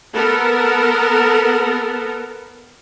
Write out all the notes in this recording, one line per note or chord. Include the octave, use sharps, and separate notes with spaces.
B3 A4 A#4